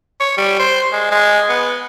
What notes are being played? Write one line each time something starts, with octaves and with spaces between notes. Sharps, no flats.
C#5
G3
C5
G#3
G#3
B3